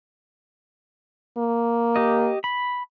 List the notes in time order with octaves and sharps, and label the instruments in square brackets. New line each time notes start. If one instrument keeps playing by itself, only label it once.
[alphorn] A#3
[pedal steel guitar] G4 D#5
B5